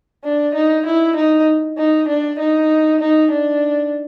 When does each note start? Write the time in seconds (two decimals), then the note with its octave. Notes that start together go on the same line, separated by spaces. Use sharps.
0.24 D4
0.55 D#4
0.86 E4
1.16 D#4
1.78 D#4
2.08 D4
2.39 D#4
3.00 D#4
3.31 D4